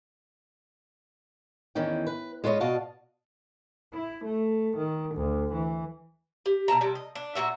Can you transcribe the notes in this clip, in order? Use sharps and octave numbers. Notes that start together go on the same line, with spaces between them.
E2 D#3 E3 C#4 G5
B4
G#3 F4 B4 C#5 D#5
B2 F#4 D5 D#5 F5 A5
E4
A3
D#3
D2
E3
G4
B2 C#4 A5 A#5
C3 G3
D#5
D4
A#2 C#3 F#4 E5